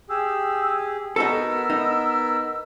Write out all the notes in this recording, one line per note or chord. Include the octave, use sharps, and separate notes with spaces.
G4 G#4 E6
B3 D#4 F#4 A4 A#4 B5 E6
D#4